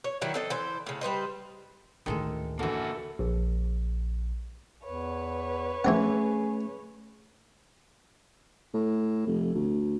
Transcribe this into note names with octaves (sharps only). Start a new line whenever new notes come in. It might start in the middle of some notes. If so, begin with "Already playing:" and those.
C#5
D#3 F#3 D4 E4
C4 A4 D#5
E3 C5
A2 C#3
G3 B4 C5 D#5
A1 D2 D#3 G#3 A4
D3 E3 A#3 F#4 A4
A#1
E2 B4 C#5
E3 A3 C4 C#4 G#4 F#5
A2
F1
D2